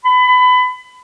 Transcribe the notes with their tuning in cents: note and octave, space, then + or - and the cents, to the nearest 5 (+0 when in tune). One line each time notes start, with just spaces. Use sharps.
B5 +25